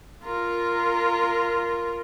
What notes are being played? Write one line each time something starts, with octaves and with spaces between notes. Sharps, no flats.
F4 A#4